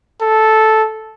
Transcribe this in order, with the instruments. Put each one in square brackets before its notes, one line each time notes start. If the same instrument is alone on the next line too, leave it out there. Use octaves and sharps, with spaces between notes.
[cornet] A4